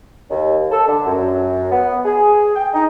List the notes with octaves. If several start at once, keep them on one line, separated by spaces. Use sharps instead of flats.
D#2
A4
D3
F#2
B3
G#4
G5
D#4